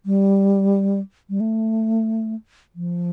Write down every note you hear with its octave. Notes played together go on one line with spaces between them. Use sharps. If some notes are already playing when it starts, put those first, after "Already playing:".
G3
G3
A3
F3